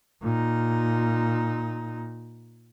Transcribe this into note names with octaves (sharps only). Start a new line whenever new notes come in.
A#2 D#4